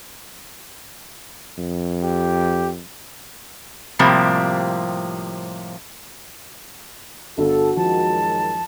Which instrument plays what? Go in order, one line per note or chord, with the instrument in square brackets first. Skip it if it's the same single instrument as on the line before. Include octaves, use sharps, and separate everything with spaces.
[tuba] F2
[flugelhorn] G4
[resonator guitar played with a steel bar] A2 C3 F3 G3 A#3 C4
[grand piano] G1 [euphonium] F#4 [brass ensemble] A4
[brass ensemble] F#2 D#3 G#3 [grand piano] F3 [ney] A5